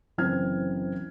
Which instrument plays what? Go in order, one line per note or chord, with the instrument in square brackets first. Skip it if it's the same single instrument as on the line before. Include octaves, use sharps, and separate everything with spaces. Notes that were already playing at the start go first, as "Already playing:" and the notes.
[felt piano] F#1 E3 C4 F6 G#6